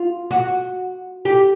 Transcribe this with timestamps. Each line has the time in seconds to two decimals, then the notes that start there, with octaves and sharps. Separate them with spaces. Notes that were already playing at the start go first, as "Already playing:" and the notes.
Already playing: F4
0.31 F#4
1.25 G4